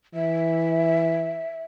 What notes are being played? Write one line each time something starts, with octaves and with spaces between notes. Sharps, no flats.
E3 E5